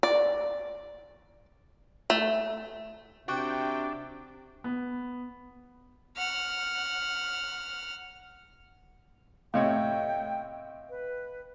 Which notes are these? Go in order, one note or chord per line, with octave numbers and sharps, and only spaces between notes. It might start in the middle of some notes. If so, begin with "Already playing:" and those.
D5
A3
C3 D4 F#4 G5
B3
F#5 F6
A2 C3 C#5 D#5 F5 G5
B4